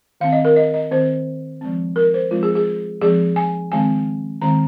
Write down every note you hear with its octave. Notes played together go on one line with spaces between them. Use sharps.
D#3 C4 F5
D#5
A#4
D#5
D#5
D#3 C4 C5
F3 G#3 C4
A#4
C5
F3 G#3 C4 F4
G#4
G#4
F3 G#3 C4 G#4
G#5
D#3 G#3 C4 G#5
D#3 G#3 C4 A#5